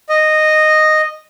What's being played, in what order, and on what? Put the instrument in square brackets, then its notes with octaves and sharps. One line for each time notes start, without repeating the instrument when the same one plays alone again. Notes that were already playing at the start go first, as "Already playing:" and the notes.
[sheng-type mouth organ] D#5